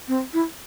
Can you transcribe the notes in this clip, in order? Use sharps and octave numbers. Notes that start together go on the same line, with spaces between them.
C4
E4